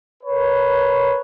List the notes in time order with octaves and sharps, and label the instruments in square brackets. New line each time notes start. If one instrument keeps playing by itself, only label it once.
[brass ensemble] A#4 B4 C#5